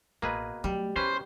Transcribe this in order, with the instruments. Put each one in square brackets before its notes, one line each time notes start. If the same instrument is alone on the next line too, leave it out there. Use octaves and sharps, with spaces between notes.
[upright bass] A1 [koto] B2 [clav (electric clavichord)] A#3 G#4 B4
[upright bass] F#3 A3 [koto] G3
[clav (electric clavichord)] C#4 B4 [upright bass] E4 [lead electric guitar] C5